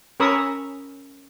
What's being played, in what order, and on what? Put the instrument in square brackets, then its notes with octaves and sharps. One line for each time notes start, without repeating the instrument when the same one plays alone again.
[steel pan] C#4 A#4 B5 C#6 D#6 E6